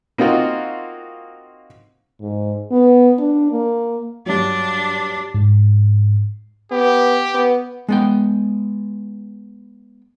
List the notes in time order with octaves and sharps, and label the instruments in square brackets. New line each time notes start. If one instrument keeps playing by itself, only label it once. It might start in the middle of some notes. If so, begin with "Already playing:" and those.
[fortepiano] A#3 C4 D#4 F4 F#4
[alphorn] G#2
B3
D4
A#3
[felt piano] G2 F#3 [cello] D4
[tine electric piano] G#2
[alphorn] B3 [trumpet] G4
[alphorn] B3
[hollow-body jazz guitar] G#3 B3 G5